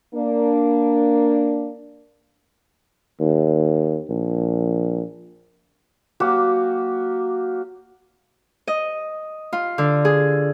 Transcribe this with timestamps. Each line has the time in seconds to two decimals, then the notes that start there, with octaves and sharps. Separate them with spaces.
0.14 A#3 D4
3.20 D#2
4.09 A#1
6.20 F#3 A#3 F#4 G4
8.67 D#5
9.53 F4
9.78 D3
10.05 G#4